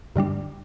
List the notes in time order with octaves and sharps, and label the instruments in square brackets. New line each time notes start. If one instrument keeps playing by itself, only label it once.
[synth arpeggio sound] G2 D3 G3 D4